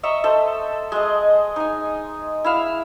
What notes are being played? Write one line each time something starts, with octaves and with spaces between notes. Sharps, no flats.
D#5 E5 A#5 C#6
A4 C5
G#3 D#5
D#4 G#5
E4 E5 F5